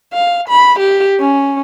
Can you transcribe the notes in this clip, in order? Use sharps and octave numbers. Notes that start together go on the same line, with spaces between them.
F5
B5
G4
C#4